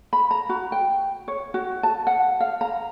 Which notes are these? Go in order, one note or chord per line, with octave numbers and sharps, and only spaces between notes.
B5
A#5
F#4
G5
C#5
F#4
A5
F#5
F5
A#5